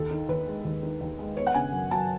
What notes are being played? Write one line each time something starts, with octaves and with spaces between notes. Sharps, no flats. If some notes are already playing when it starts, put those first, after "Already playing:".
Already playing: D#2 A4
D#3
D#2 B4
G#3
D#2
D#3
D#2
G#3
B3 C#5
F#5
C#3 G#5
F#2
F#3 A5